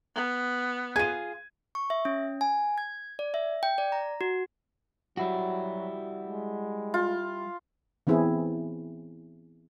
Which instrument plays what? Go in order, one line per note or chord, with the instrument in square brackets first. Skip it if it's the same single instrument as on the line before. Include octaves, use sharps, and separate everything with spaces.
[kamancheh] B3
[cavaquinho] F4 G#4 [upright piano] G#6 D#7
[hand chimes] C#6
E5
C#4
G#5
G#6
D5
E5
G5
D5
A#5
F#4
[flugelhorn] F#3 [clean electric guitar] G3 E4 F#4
[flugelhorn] G#3
[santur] F4
[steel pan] E3 B3 C4 E4 G#4